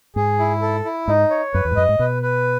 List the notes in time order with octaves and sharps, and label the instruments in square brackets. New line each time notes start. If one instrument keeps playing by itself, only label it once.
[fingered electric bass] G#2 [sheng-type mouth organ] G#4
[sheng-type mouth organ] E4
A4
E4
[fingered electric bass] G#2 [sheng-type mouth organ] D#4
[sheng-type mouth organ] C#5
[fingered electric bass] F#2 [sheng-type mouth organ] B4
[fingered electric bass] E2
G#2
[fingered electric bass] F#2 [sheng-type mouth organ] D#5
[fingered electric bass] G#2
[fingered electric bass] B2 [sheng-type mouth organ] B4
[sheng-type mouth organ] B4